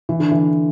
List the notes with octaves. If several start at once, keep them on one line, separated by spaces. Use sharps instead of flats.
E3
D3
E3